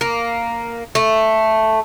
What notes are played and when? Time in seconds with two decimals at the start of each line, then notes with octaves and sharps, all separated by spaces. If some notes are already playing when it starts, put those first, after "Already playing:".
0.01 A#3
0.95 A3